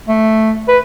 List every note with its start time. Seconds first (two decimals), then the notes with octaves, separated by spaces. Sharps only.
0.08 A3
0.68 B4